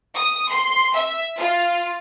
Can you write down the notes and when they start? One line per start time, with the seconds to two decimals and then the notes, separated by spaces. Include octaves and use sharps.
0.16 D#6
0.49 C6
0.95 E5
1.38 F4